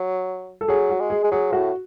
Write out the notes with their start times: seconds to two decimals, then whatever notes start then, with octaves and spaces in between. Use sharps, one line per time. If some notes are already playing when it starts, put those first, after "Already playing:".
Already playing: F#3
0.61 A4
0.68 F#3 G#4
0.90 F#4
1.00 G#3
1.10 G#4
1.24 G#3
1.32 F#3 G#4
1.52 A2 F#4